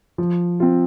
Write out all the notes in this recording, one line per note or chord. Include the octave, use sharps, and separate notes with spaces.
F3
C4 F4